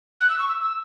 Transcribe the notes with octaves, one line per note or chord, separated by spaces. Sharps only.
F#6
E6
C#6
E6
E6